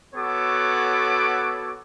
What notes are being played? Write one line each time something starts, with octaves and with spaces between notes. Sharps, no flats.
B3 F#4 A4 C#5 D6